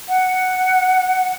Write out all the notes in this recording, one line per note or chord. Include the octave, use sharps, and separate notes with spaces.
F#5